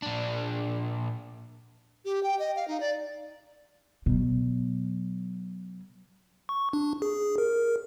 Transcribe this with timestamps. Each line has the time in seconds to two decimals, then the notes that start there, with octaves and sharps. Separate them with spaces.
0.02 A#2 D4
2.05 G4
2.23 G5
2.39 D#5
2.56 F5
2.68 D#4
2.80 D5
4.06 B2 F#3
6.49 C#6
6.73 D4
7.02 G#4
7.38 A#4